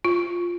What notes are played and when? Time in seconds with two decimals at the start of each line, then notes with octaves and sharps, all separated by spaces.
0.05 F4